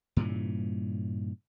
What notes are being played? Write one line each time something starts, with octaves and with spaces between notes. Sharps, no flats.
G2 A#2 C#3 E3